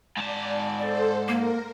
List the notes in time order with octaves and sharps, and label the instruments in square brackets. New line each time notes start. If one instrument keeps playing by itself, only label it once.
[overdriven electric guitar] G#2 A5 [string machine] D5
[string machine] A4 C5 [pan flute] D5
[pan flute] A#3 [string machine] A#4